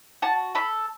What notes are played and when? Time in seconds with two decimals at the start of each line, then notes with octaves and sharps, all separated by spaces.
0.22 F#4 A5
0.55 A4 B5